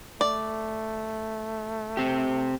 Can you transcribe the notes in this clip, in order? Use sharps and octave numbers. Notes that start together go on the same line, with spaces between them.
A3 D5
C4 G4